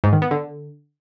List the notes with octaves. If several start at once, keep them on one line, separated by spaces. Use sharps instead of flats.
G#2
D#3
B3
D3